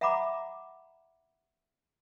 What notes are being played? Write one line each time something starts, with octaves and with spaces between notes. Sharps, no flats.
E5 F#5 A#5 B5 D6